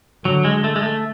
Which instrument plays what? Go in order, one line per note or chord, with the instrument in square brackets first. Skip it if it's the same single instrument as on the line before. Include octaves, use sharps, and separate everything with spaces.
[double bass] D3 [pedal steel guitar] F#3
[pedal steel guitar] G#3
A3
G#3
A3